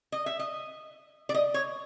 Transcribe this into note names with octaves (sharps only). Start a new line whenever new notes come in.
D#5
E5
D#5
D5
D#5
C#5